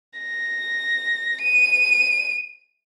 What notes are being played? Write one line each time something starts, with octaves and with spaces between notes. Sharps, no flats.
A#6
D#7